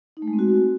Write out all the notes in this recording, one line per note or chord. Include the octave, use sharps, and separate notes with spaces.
D#4
A3
G#3
C4
F#4